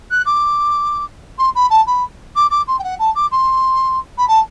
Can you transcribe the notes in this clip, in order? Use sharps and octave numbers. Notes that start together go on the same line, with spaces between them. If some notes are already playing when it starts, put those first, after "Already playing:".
F#6
D6
C6
B5
A5
B5
D6
D6
C6
G5
F#5
A5
D6
C6
B5
A5